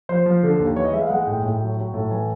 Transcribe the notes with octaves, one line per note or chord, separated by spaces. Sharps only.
F3 C5
F3
D3
D#2
E3 C#5
D#5
G#3 E5
F5
G#3 F#5
A2 G5
A2
F#3
F#3
A2
E3 G#5